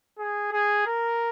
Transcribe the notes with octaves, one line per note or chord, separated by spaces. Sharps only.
G#4
G#4
A#4